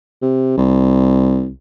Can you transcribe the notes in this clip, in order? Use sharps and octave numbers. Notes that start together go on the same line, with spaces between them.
C3
C2